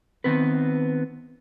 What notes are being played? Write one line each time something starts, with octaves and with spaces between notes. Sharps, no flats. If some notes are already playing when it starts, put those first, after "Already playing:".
D#3 B3 C4 B4